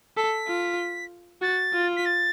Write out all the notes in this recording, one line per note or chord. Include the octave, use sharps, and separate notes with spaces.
A4 B6
F4
F#4 A6
F4
B6
A6